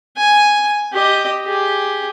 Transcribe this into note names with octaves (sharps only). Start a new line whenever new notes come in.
G#5
G4 D#5
G4 G#4